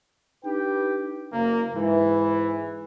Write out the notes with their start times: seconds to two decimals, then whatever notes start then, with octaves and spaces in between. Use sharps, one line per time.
0.44 D4 D#4 G4 B4 G5
1.33 F#1 A#3
1.74 G#2 E3